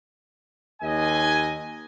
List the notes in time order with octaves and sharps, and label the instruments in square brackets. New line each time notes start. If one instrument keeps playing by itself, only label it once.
[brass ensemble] D#2 D#5 G#5